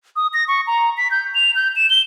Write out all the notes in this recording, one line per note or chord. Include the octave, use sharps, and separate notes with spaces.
D#6
A#6
C#6
A#5
B6
G6
F7
G6
E7
G7